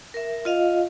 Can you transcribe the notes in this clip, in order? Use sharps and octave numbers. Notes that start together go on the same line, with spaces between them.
A#4 E5
F4 D#5 F5